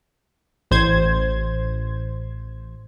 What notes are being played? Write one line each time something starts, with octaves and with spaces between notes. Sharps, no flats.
A1 C5 G#6